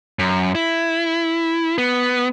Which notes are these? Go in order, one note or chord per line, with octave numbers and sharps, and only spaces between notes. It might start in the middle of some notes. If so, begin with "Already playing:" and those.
F#2
E4
B3